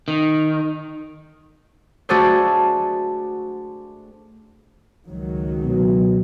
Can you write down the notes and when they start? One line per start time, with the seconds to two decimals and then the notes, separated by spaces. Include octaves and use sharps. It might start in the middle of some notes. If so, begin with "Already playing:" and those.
0.08 D#3
2.09 A3 D4 F#4 G#4 A4 C5
5.06 C#2 D#3 F#3
5.64 B2